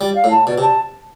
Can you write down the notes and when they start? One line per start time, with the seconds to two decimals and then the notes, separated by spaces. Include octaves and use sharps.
0.01 G3 D5
0.15 F5
0.24 A2
0.31 A5
0.47 B2 D5
0.58 C3
0.62 A5